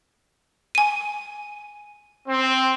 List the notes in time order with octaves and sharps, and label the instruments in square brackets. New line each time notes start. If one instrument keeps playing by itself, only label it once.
[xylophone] G#5 D#7
[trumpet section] C4